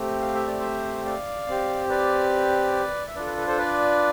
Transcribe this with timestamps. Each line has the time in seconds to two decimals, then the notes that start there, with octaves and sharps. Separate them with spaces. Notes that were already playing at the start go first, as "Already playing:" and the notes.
Already playing: A3 C4 G4
0.21 F5
0.34 E5
0.47 D5
0.60 C5 E5
1.05 D5 F5
1.48 C4 G4
1.90 B4 D5
3.07 E5
3.15 D4 F4 A4 B4 D5
3.26 B4
3.37 B4
3.47 A4 C5
3.58 B4 D5